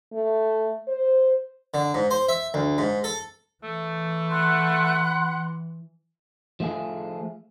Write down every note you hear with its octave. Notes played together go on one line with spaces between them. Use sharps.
A3
C5
D3
G#2
C5
E5
D2
G#2
A4
E3 A3
F#5 B5 C6 F#6
F3 A3 F4 G#4